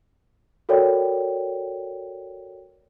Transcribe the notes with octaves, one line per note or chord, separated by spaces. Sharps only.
F#4 A4 A#4 C#5 D5 G5